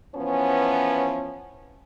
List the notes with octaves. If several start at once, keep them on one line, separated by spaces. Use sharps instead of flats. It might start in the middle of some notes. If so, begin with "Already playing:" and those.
E3 F3 B3 C#4